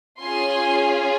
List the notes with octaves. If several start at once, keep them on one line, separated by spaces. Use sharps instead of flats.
C#4 F4 G#4 G#5 C6